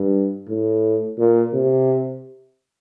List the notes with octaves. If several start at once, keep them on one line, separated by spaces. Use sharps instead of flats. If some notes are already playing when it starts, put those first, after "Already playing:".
Already playing: G2
A2
A#2
C3